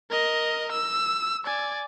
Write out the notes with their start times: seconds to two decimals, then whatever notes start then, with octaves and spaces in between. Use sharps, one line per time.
0.10 A#4 D#5
0.72 E6
1.45 D5 G#5